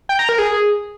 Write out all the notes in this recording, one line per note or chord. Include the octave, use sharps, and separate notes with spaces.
G5
A#5
A#4
G#4